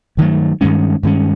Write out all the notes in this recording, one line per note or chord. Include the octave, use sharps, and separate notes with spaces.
G2 D#3 F#3 A3
G2 D#3 G#3 C#4
G2 D#3 G#3 C#4